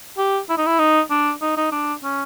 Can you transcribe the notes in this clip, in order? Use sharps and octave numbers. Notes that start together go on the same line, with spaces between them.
G4
E4
D#4
E4
D#4
D4
D#4
D#4
D4
C#4